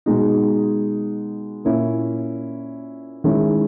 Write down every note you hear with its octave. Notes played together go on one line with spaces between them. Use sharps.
B2 G#3 D#4
A#2 A#3 C#4 E4
D#3 G#3 C#4 E4